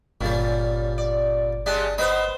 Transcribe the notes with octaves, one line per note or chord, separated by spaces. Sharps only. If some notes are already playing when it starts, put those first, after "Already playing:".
G1 A#2 G3 C#4
D5
C#3 G#3 D4 G4
B3 D#4 C5 B5